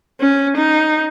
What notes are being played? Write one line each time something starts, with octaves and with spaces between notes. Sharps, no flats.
C#4
D#4